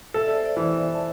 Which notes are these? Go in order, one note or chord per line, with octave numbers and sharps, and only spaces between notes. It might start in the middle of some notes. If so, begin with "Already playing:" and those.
A4 E5
D5
C5
D5
E3
A5